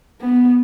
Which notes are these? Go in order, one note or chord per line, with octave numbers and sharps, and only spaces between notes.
B3